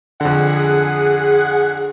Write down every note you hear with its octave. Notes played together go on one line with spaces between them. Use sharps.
F2 D3 G#4 F#5